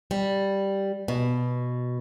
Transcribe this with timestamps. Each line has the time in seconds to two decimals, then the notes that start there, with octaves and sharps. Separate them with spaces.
0.11 G3
1.08 B2